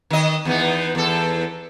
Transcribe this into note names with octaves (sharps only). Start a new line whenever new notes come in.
D#3 D#5
E2 B3 D#4
E2 A4